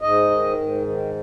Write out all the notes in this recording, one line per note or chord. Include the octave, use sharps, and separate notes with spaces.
G#2 D#5
D#3
G#2
D#3